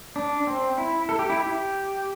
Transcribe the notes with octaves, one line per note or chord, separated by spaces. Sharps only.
D4
C4
E4
A4
G4
E4
G4